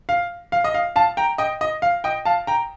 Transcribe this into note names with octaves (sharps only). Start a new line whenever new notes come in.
F5
F5
D#5
F5
F5 A5
G5 A#5
D#5 G5
D#5
F5
D#5 G5
F5 A5
G5 A#5